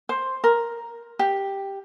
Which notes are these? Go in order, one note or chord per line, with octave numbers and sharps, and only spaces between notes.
C5
A#4
G4